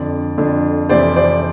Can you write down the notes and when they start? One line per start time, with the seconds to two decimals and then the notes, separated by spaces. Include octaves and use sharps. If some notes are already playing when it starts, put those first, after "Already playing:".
Already playing: F2 D3 D5
0.38 F2 D3
0.89 F2 C3 E3 C5 D5
1.16 C5 D5